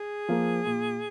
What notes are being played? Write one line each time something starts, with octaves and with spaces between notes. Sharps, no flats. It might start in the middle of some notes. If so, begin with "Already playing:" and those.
Already playing: G#4
F3 A#3
A#2